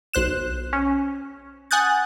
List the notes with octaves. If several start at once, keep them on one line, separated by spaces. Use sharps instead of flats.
B1 C5 F#6 E7
C#4
F#5 G#5 D#6 F#6 G6 A6